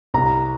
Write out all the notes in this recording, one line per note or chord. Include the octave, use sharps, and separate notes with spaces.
C2 A#5